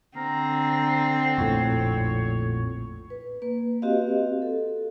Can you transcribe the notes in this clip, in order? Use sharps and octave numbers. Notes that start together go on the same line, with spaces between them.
D3 C4 A#5
A#1 F2 A2 C#5
B4
A#3 B4
C4 F#4 G4 D#5 F5
A4